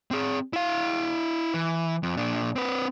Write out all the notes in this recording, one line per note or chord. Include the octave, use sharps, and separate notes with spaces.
C4 G#4
E4 F5
E3
F2
A#2 D4
C4 B4